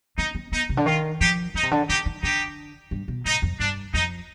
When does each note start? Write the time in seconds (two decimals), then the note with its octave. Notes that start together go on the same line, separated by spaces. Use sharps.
0.17 C4 D#4
0.35 C4
0.52 B3 D#4
0.69 C3
0.77 D3
0.86 D#3 F4
1.20 F3 D#4 G4
1.54 F3 D#4
1.63 C3
1.71 D3
1.88 D#3 D#4 G4
2.06 D#3
2.22 D3 D#4 G4
2.91 G2
3.08 B2
3.25 G#2 D#4
3.42 F2
3.59 G2 D4
3.93 F2 D#4